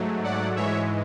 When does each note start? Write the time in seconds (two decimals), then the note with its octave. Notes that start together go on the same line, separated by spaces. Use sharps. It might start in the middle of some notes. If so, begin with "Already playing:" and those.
Already playing: G#2 F#3 A3
0.24 D5 F#5
0.56 G#2 E3 G#3 C#5 E5